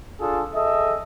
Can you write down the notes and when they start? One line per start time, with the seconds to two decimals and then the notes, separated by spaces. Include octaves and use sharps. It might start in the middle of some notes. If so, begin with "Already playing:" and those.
0.20 D4 F4 G#4 A4
0.54 G#4 A4 D#5 E5